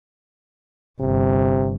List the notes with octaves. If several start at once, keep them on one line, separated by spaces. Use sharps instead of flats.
G1 C3